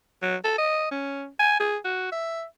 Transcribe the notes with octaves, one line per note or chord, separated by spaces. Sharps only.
F#3
A4
D#5
C#4
G#5
G#4
F#4
E5